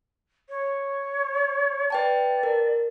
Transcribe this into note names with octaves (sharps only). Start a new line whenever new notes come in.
C#5
B4 D5 G5 A5
A#4